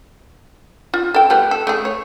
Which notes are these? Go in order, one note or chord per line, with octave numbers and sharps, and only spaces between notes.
F4
A4 G5
G3 A3 B3
A4
A3 G#4
C#5